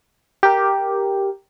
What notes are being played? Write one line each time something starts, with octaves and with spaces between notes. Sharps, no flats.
G4 A#4